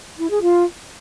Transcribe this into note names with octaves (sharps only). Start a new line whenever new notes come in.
E4
G#4
F4